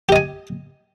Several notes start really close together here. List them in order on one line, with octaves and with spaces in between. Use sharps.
G4 D#5 G#5